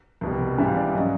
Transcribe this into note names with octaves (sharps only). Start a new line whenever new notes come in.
C2 B2 G3
G#2 E3 G3 E5
F5
D5
C#3 F#3 D#5